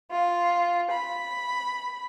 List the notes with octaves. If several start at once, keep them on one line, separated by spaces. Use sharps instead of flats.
F4
B5